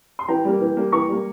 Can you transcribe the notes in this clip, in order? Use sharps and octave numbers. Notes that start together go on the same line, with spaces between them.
C6
E3 G5 A#5
G3 A#3
E3
G3 A#3
E3 A#5 C#6
G3 A#3